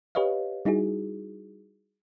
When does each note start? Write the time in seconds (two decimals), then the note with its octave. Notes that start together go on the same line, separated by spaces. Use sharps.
0.15 G4 B4 C#5 D#5 F5
0.65 G3 D#4 E4 F#4 G#4